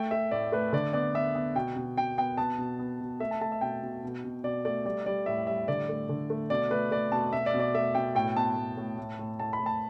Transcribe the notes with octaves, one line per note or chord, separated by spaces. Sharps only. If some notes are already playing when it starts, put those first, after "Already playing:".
Already playing: A3 G5
A3 E5
A2 D5
A3 B4
D3 D5
B3 D5
B3 E5
B3
B2 G5
B2
B2 G5
B3 G5
B3 A5
B2
B3
B2
A3 E5
A5
A3 A5
E5
B2 G5
B2
B2
B2
B2 D5
A3 D5
G3 D5
G3 D5
A2 E5
G3 E5
D3 D5
A3
D3
A3
B2 D5
A3 B4
A3 D5
B2 A5
B2 E5
D5
B2
D5
A3 E5
B2 G5
A2 G5
B3 A5
A2
A2
A2
A2
A2 A5
B5
A2
A5